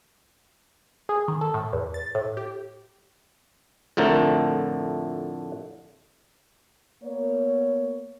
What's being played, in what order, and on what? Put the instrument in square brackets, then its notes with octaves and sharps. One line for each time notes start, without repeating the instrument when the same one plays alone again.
[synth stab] G#4
D#3
A4
A2
E2
A6
A2
G4
[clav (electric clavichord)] F2 A2 D3 A3 A#4
[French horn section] A#3 B3 C#5